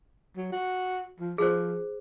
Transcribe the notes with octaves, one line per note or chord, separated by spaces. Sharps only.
F#3
F#4
F3
F3 G#4 C5